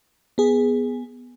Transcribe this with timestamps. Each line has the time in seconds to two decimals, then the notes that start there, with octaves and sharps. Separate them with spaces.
0.38 B3 G#4